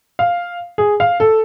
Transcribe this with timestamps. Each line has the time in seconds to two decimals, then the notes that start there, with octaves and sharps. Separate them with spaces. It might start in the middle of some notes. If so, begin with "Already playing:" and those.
0.19 F5
0.78 G#4
1.00 F5
1.20 A4